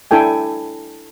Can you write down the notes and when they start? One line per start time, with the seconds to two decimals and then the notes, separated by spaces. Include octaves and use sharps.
0.11 D4 E4 A4 G5 G#5